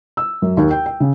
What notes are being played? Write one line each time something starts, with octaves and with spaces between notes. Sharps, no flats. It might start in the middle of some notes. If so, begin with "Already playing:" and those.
E6
F#2
D#2
G5
G5
C#3